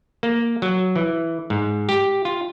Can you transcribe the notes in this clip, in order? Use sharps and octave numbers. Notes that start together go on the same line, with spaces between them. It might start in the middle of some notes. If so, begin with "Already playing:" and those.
A#3
F#3
E3
G#2
G4
F4